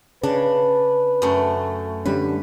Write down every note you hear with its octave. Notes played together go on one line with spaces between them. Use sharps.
C#3 D4 B4
F#2 A3
D3 G3 C#4 B4